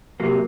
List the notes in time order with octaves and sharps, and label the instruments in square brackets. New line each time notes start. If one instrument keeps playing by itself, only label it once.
[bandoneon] C3 [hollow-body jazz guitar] F#3 A#3